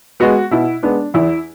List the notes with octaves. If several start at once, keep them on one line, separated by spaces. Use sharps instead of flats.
G#3 B3 F#4
B2 E4
G#3 B3 D4
E2 E4